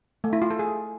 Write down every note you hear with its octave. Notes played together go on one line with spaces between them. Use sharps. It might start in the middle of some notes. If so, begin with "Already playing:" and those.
A3
E4
F4
A4
G#4